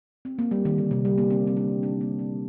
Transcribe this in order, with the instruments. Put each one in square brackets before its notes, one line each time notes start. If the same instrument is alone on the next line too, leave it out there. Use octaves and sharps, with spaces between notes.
[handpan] C4
A#3
G3
D#3
D3
C3
G3
A#3
C4
C4
D4
D4
A#3
C4